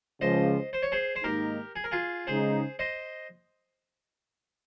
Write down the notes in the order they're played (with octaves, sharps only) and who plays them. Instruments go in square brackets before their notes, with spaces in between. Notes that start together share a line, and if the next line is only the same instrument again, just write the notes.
[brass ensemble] C#2 C#3 F3 [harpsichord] C5 D#5
[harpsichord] C5
C#5
G#4 C5
C5
[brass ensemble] G#2 D#3 A#3 D#4 [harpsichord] G4 A#4
[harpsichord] G#4
A#4
F4 G#4
[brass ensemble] C#3 G#3 D#4 [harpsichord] G#4 C5
[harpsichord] C5 D#5